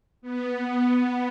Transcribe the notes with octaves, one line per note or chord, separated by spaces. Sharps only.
B3